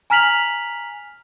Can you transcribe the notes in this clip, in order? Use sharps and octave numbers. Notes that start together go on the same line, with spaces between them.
G#5 A#5 F6 B6 F7 F#7